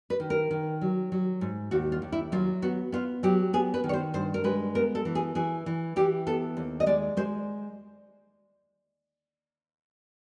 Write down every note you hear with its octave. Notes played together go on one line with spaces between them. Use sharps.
B4
D#3
A#4
D#3
F#3
F#3
G#2
D#2 F#4
F4
D#2
E4
F#3 F4
B3 F#4
B3 F4
F#3 G4
B3 G#4
B4
D#3
C#5
C5
G2 C5
A#4
G#3 B4
B3 A#4
A4
E3
G#4
E3 G#4
E3
E3 G4
B3 A4
D#2
D#5
G#3 D5
G#3 C5